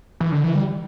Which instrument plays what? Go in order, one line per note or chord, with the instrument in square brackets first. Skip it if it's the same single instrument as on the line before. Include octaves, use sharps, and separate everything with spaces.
[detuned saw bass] E3
D3
E3
G3